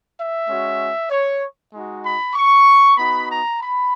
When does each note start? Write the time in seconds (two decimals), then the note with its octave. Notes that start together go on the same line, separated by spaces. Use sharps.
0.16 E5
0.48 G#3 C#4 F#4
1.10 C#5
1.72 G#3 D#4 F#4
2.03 B5
2.35 C#6
2.97 B3 D#4 F#4 B5
3.28 A#5
3.60 B5